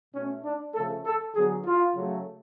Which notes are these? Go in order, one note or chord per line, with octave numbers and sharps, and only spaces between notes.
B2 A3 C#4
D4
C#3 F3 A3 A4
A4
D3 F#3 B3 G#4
F4
C#3 F#3 A3